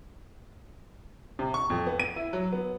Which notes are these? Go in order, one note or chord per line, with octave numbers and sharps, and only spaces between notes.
C3
C#6
F2
B3
D#7
E4
F#3
B3